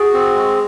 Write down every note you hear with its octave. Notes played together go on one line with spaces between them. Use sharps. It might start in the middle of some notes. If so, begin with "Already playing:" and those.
Already playing: F#4 G#4
C4
G#3